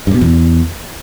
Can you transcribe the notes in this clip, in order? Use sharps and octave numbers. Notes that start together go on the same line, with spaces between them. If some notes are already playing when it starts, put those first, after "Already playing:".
G2
B2
E2